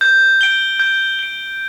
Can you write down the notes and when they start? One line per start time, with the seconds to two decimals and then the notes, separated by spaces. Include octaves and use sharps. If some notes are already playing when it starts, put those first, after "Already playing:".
0.01 G6
0.41 D7 G7
0.80 G6
1.19 D7 G7